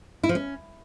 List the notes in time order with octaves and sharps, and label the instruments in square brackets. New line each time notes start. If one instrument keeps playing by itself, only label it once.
[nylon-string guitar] E4
F3
C#4